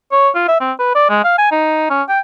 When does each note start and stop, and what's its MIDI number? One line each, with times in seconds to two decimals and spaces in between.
0.12 0.29 73
0.35 0.46 65
0.48 0.57 76
0.60 0.72 60
0.79 0.90 71
0.95 1.06 74
1.10 1.20 56
1.24 1.34 77
1.38 1.51 80
1.51 1.86 63
1.90 2.03 61
2.09 2.20 79